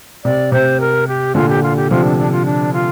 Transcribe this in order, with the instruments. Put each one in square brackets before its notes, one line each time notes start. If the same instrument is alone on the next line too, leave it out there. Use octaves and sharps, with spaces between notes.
[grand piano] C3 [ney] D5
[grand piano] C3 [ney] C5
[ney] A#4
G4
[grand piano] A#2 D3 [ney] F4
[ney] G4
F4
G4
[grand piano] C3 F3 [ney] F4
[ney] D4
D4
F4
D4
F4